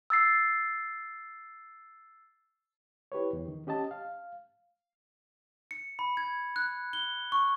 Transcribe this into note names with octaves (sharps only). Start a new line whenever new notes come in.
E6 A6 C7
E4 G4 B4 C#5
E2
D#3
C#4 G4 D#5 A5
F5
C#7
B5
G#6
F#6
G7
C#6